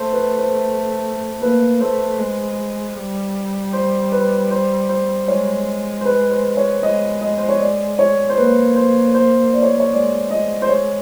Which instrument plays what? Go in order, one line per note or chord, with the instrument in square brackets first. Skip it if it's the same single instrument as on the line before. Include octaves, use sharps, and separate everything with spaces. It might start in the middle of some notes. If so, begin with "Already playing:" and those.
Already playing: [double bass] A3 [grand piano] C5
[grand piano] B4
C5
[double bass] A#3 [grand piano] B4
[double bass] A3 [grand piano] C5
[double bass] G#3
G3
[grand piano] C5
B4
C5
C5
[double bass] G#3 [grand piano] C#5
[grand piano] C5
B4
C5
C#5
[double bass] G#3 [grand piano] D#5
[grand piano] D#5
C5
C#5
D5
C#5
C5
[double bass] A#3 [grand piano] B4
[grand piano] C5
C5
D5
C#5
C5
C#5
[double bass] G#3 [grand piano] D5
[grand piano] D#5
C5
C#5